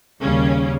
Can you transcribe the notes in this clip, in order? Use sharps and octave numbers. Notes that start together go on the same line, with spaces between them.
D#2 C#3 G3 C#4